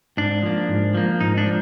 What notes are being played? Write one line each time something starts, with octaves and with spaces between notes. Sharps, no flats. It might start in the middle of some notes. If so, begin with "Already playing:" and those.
G#2 D4
F3 A#3
G#2
F3 A#3
G#2 D#4
D4
F3